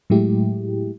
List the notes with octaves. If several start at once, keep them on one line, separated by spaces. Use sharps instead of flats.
A2 F#3 G#3 A3 E4 G4